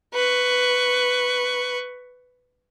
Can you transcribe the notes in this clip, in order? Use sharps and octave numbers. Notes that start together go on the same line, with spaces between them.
B4 C#6